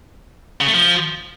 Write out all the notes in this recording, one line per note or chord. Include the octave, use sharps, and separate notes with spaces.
C#3
A3
F3